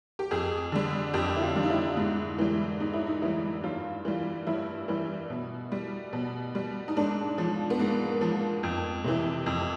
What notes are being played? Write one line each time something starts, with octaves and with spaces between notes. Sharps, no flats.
G4
F2 G#4
D3 G3
F2 G4
E4
F4
D3 G3
D#4
E4
G#2
E3 G3
G#2 D#4
E4
D#4
E3 G3 E4
G2 F4
E3 G3
G2 E4
E3 G3
B2
G3
B2
G3
D#4
G#2 D4
F3
B3
G#2 A#3
F3
F2
C3 E3
F2